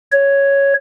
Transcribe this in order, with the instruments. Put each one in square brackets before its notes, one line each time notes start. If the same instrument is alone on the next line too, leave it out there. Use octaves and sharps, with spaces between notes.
[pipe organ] C#5